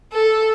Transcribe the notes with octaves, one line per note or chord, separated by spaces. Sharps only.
A4